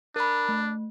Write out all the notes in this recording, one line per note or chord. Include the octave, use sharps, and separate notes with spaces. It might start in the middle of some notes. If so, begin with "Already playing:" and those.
D4 A#4 B5
A3